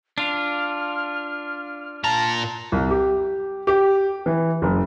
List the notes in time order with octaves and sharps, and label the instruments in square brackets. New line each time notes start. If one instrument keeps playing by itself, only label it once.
[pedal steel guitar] D4 F4 [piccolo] F6
[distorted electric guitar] A#2 A#5 [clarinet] A5
[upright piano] C2
G4
G4
E3
F#1